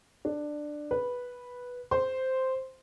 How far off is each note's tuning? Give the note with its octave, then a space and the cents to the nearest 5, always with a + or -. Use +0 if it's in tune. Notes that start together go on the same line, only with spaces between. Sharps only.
D4 +15
B4 -5
C5 -5